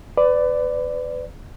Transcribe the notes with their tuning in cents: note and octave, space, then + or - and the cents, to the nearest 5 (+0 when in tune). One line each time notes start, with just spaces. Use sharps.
B4 +30 D5 +0